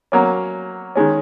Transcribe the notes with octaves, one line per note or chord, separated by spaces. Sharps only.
F#3 A#3 C#4
D#3 G#3 C#4